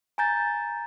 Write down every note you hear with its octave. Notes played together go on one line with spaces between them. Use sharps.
G#5 A#5 G6 A6